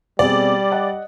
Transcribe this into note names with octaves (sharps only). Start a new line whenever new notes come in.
B2 G3 C4 G#4 D5
D#5 F#5